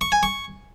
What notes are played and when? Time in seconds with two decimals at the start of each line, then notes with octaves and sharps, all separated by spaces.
0.01 C#6
0.12 G#5
0.23 C#6